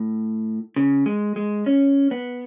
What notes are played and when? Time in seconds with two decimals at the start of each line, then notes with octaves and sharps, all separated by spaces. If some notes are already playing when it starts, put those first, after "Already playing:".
Already playing: A2
0.76 C#3
1.06 G#3
1.36 G#3
1.66 C#4
2.11 B3